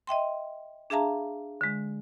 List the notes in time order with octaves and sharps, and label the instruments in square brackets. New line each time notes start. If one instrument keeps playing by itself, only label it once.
[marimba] D#5 E5 G5 C6
D4 G#4 E5 F5 A5 A#5
D3 G#3